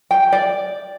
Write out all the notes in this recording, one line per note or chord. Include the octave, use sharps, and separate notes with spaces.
G5
D5